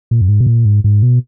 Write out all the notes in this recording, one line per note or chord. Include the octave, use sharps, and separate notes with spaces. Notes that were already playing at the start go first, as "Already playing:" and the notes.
A#2
F#2
G#2
B2
A#2
G#2
G#2
B2